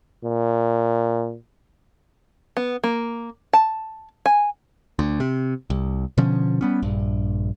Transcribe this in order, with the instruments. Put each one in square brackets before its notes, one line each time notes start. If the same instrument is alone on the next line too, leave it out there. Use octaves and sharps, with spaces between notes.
[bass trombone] A#2
[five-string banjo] B3
A#3
A5
G#5
[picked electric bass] D2
C3
C2
B2 D3 F3 C#4
G3 B3 C#4
A#1 G2